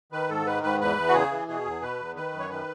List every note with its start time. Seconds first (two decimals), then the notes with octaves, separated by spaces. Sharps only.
0.12 D#3 B4
0.29 G#2 A4
0.46 D#3 B4
0.63 G#2 B4
0.81 E2 B4
0.97 E2
1.08 F#4
1.14 C#3 G#4
1.31 E3
1.48 B2 G#4
1.65 E2
1.82 B2 B4
1.99 E2
2.15 D#3 B4
2.33 F#2
2.39 C#5
2.49 D#3 B4